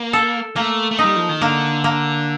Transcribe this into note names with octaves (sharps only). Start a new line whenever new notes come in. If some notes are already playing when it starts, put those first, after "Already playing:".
Already playing: A#3
A4
A3 A#3
A3
D#4
G3
F3
D#3
D3 A#3
A#3